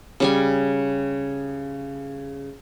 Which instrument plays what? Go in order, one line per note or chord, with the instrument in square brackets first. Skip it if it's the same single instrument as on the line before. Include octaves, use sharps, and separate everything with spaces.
[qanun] C#3 G3 G#5